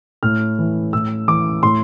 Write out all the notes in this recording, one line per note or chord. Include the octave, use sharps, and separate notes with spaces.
A2 F6
E3
A2 E6
E3 D6
A2 C6